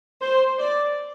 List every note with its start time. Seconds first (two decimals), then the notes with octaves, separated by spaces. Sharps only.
0.21 C5
0.58 D5